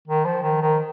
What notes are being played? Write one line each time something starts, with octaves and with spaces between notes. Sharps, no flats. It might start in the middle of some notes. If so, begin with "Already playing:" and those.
D#3
F3
D#3
D#3